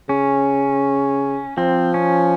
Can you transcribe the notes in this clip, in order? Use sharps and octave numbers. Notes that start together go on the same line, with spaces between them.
C#3 C#4
F3 C4
C#4